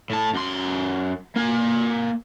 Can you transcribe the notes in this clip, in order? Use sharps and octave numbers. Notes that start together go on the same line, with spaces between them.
A2 A5
F#2 C6
A#3 G#5